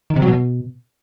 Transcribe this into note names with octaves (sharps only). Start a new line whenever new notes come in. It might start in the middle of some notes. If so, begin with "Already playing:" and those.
D#3
C3
F#3
B2